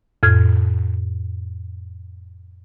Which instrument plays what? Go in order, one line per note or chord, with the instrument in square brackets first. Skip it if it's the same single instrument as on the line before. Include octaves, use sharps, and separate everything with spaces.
[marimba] F2 A2 F6 G#6